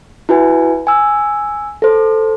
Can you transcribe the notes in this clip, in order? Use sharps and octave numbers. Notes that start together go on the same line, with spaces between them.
E4 F#4 B4 G#5
G#5 E6
A4 C5